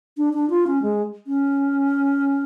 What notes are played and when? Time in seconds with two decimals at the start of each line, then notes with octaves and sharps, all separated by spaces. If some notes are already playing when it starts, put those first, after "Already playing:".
0.18 D4
0.34 D4
0.50 F4
0.67 C#4
0.82 G#3
1.27 C#4